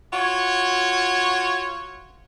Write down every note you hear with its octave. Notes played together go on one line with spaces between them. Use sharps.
F4 F#4 C#5